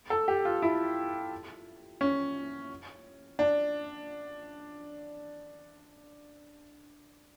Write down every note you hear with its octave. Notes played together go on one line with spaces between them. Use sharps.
A4
G4
F4
E4
C#4
D4